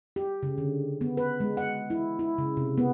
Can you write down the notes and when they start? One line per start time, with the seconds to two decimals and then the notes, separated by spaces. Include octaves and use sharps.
0.16 G4
0.43 C#3
0.58 D3
1.01 B3
1.17 B4
1.40 G#3
1.57 F#5
1.90 E4
2.19 E4
2.38 C#3
2.57 C3
2.78 B3